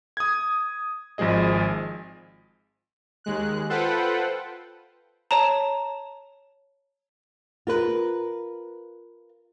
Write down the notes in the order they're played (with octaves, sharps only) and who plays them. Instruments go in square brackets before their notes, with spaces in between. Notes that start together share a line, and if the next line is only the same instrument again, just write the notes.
[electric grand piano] D#6 G#6
G#1 F3 G#3 G#4 D#5
[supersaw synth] D#2 G#3 F#6
F4 A4 B4 C5 F#5 G5
[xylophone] C#5 A5 A#5
[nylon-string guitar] F4 A#4 B4